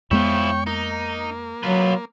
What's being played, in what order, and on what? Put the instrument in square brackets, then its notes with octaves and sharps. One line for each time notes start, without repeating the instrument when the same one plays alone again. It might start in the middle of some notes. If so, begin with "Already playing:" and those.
[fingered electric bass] F2 G#3 B3 [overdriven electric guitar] F3 E4 [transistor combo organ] C#5 G5 C#6
[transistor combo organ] A#3 [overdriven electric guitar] D#4
[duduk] F#3 [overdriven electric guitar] F4 B4